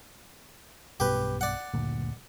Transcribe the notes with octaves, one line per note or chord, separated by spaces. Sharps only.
B1 G2 B2 G4 B4
D5 F#5
F#1 D2 A#2